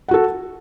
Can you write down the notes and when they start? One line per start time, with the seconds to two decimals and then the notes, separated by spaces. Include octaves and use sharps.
0.09 F#5
0.11 F#4
0.14 A4